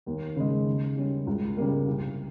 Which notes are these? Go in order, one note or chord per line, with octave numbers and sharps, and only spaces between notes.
D#2
C#3 G#3
C#3
G3 C#4
C#2
C#3 G3 A#3
C2